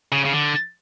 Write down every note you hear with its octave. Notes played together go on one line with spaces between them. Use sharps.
C#3
C#3
D3